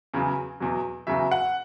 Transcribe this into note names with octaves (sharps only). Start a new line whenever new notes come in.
E2 C#3 F#3
E2 B2 F#3
E2 C#3 F#3 E5
F#5